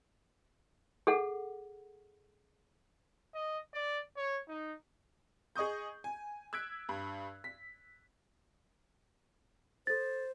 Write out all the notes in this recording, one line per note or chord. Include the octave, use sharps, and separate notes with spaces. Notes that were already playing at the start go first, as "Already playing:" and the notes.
G#4 A4 F#5
D#5
D5
C#5
D#4
G#4 D#5 C#6 D#6 G6
G#5
E6 F#6 G#6 B6 D7
G2
B6
A4 C5 A6